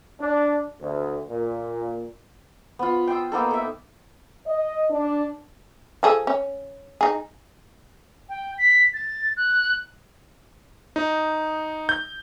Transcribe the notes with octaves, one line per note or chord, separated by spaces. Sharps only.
D4
D2
A#2
B3 F4
G5 C6 D#6 E6
A#3 B3 D#4 A4
A4 E5
D#5
D4
F3 G#4 A4
C#4
D#4 G#4
G5
B6
A6
F#6
D#4
G6